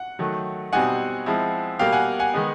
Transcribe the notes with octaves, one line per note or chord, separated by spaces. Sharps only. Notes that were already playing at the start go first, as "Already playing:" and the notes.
Already playing: F#5
D#3 F#3 A3
B2 G3 C4 D#4 F#5 G#5
F3 G#3 C4 E4
B2 G3 A#3 F5 G5
F#5 G#5
F#5 G#5
D#3 G#3 B3 D#4